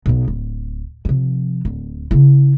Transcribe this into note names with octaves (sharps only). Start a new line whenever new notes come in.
B1 B2
D1
C3 F3
D1
C#3 E4